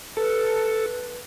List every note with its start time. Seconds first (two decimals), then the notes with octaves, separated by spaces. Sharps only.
0.17 A4 B4